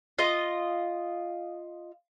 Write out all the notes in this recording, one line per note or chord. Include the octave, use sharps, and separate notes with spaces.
F4 D#5